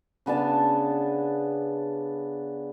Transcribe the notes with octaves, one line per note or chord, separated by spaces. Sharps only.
C#3 B3 D4 A5